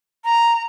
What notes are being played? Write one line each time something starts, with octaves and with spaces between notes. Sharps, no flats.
A#5